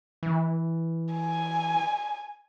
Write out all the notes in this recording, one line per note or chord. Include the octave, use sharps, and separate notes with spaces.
E3
G#5